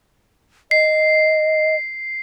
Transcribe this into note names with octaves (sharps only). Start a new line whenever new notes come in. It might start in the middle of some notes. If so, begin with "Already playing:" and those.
D#5 C7